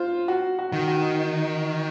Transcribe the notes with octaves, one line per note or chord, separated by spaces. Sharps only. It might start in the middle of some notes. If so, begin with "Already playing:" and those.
Already playing: F4 C5
F#4
F#4
D#3
F#4